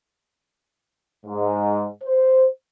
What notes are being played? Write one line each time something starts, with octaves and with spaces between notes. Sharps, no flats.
G#2
C5